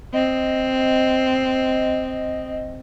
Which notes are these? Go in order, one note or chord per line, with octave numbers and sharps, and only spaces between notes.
C4 D#5